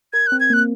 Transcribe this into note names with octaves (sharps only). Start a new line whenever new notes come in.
A#4 G#6
C4 F#6
G#6
A#3 F#6